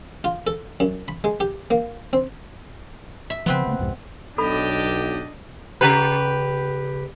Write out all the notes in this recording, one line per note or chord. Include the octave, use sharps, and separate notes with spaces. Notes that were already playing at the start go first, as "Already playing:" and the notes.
F4
A4
F#2
B5
G#3
G4
A#3
C4
E5
C#3 F3 B3 C4 B4
C#3 A3 A#3
C2 F2 G#2
B1 D4 G4 A4 D#5 B5
C#3 G4 B4